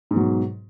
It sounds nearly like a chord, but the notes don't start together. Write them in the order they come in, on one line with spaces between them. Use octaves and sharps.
G#2 B2 F#3